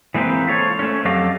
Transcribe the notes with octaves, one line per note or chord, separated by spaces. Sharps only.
E3 G#3 A#3 C4 B4
F4 A4 C5 C#5
A3 C#4
F2 F#3 G4 A4 D#5 F5